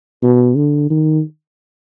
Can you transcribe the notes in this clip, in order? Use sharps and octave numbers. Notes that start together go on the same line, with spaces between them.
B2
D3
D#3